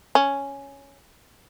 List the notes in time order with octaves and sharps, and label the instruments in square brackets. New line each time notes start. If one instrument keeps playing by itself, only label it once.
[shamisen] C#4